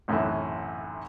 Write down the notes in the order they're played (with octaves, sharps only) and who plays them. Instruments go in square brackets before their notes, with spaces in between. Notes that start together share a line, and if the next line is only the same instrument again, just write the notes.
[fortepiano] B1 F#2 A2 C3 E3